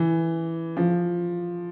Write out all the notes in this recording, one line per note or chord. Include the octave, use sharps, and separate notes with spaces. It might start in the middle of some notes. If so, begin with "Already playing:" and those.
Already playing: E3
F3